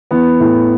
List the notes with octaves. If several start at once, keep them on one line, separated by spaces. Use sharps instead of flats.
E3 B3
A2